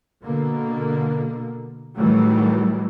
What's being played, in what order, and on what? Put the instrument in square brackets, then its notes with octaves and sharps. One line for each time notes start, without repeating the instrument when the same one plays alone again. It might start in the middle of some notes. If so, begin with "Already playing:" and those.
[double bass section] B2 D3 A#3
A2 D#3 E3 F#3 G3 A3